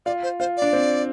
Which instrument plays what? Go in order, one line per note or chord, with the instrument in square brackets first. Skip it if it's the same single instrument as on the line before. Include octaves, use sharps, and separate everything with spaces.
[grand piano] F4 [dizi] D5
[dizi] C5
[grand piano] F4 [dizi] C5
[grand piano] D4 [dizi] D5
[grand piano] C4